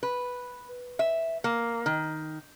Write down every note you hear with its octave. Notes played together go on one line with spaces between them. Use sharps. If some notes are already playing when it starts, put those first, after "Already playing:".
B4
E5
A#3
D#3